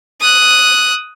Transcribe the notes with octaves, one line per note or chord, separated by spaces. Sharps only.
D#6 F#6